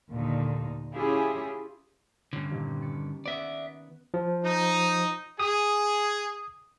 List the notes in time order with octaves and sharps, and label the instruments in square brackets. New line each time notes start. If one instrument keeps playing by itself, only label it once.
[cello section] D#2 A#2 D3 D#4
C#4 E4 F4 G4 G#4
[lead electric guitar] G2 D3 [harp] C#4
[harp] A#2 D#3 G4
B5 A6 C#7
[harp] B3 F#5 D#6 [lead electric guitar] D5 E5
[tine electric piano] F3
[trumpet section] D#4
[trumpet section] G#4 [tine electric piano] D#6